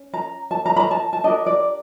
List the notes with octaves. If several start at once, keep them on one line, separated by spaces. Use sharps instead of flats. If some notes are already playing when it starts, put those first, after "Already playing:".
Already playing: C#4
A#5
A5
A#5
B5
A#5
A5
A5
D4 G4 A#4 D#5
D5